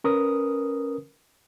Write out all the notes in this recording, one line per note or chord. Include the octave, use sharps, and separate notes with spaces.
C#4 A#4 B4 D#6